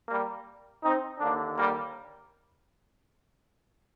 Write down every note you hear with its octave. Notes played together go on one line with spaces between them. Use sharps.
G3 A#3
C4 D#4
D#2 D3 A#3 D4
G3 A#3